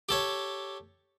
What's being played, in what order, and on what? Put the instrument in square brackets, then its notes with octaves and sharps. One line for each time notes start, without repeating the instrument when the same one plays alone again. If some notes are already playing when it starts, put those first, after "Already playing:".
[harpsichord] G4 A4 C#5